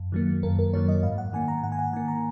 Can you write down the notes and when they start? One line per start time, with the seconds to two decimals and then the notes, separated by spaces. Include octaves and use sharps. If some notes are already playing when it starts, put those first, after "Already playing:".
Already playing: F#2
0.12 D#3 F#3 A#3
0.43 F#2 A#4
0.59 A#4
0.73 D#3 F#3 A#3 C#5
0.88 D#5
1.03 G#2 F5
1.18 F#5
1.33 D#3 A#3 G#5
1.48 A#5
1.63 G#2 F#5
1.72 G#5
1.79 F#5
1.93 D#3 A#3 G#5
2.08 A#5